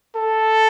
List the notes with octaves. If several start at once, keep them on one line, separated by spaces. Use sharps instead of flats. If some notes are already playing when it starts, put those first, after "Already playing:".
A4